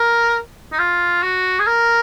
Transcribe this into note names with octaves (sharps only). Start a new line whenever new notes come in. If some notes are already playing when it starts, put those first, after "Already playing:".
Already playing: A#4
D#4
F4
F#4
G#4
A#4